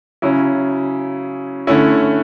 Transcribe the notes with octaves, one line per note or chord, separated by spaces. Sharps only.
C#3 F#3 C#4 E4
D3 A3 C#4 E4